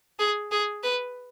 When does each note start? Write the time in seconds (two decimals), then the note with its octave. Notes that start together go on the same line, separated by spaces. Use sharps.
0.19 G#4
0.52 G#4
0.84 B4